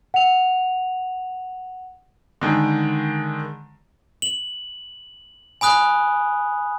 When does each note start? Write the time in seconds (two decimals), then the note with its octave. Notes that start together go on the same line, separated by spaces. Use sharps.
0.14 F#5 F7
2.41 D3 D#3 G#3
4.22 F#7
5.61 G#5 B5 D#6 F#6